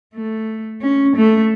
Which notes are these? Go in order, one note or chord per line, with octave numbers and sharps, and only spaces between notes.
A3
C#4
A3